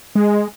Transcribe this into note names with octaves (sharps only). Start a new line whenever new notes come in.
G#3